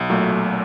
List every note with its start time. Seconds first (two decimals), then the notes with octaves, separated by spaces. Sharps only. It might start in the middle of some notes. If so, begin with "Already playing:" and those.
Already playing: B1
0.10 A#2 F#3 A3
0.32 B1